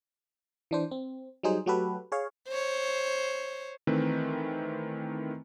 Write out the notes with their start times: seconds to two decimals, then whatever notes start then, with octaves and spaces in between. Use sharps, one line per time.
0.71 E3 D4 C5
0.91 C4
1.43 F#3 G3 D#4 G#4 C5
1.66 F#3 A3 F#4 G4 A4 B4
2.12 G#4 C#5 F5
2.48 C5 C#5
3.87 D#3 E3 A3 C4 B4